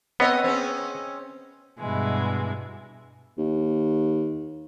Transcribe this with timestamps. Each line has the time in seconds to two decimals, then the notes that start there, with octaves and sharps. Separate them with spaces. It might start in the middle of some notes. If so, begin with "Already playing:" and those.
0.20 B3 C4 C#5 D#5
0.44 C4 C#4 G#4
1.79 G2 B2 E3 G#3
3.38 D#2